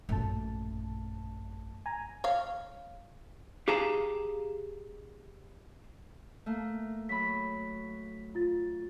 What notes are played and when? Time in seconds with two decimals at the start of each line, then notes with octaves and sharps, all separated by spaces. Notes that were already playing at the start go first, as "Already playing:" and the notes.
0.09 A1 F#2 A#2 A3 A5
1.86 G#5 A#5
2.24 C#5 F5
3.68 G4 G#4 F5 A5 A#5
6.46 A3 A#3
7.09 F#3 B5 B6
8.35 F4 A6